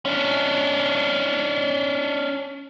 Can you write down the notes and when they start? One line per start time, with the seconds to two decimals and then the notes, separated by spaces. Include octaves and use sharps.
0.05 C#4 D4